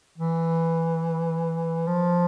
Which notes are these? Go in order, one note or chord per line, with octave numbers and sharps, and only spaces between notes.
E3
F3